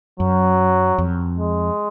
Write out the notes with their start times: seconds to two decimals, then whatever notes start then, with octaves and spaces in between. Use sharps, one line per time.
0.20 F#2 F#3
0.98 F2
1.38 G#3